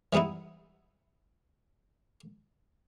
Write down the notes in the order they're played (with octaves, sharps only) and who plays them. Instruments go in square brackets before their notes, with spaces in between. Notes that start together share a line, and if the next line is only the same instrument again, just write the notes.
[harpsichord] E3 G3 B3 D#4 E4